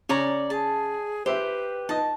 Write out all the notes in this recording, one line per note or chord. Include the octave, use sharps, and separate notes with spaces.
C#3 C#5 D5 A#5
G#4 A5
G4 B4 C5 E5
D#4 D#5 A5